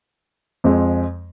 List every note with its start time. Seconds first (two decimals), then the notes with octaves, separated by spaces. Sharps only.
0.64 F2 F3 G#3 C4